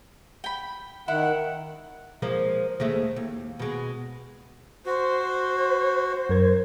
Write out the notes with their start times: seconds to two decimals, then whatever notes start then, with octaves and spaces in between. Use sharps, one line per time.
0.44 G5 B5
1.08 D#3 E4 F#5
2.22 F3 G#3 A#3
2.80 D#2 G#3 A3
3.16 D#2
3.59 B2 G#3
4.86 F#4 C5
6.29 F#2 A#4 G#6